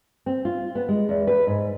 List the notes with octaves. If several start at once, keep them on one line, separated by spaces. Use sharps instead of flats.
C4
F4
B3
G#3
E2
B4
G#2